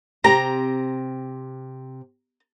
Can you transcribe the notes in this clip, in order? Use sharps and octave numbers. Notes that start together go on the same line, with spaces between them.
C3 C4 G4 A#5